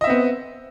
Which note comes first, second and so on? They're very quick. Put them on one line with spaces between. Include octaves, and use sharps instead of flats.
D#5 E5 C4 B3